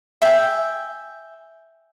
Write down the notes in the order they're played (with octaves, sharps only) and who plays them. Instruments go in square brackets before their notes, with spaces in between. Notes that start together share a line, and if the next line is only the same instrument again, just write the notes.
[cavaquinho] E5 G5 G#5